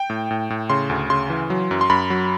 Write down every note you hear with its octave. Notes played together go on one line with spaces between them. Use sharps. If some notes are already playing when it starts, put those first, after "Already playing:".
Already playing: G5
A2
A2
A2
C#3 C6
D2
C#3 C6
E3
F#3
F#2
C6
F#2 B5
F#3